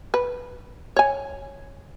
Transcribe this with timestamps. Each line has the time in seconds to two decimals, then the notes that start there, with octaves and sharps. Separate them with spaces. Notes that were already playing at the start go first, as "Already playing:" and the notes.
0.14 B4
0.96 C#5 G#5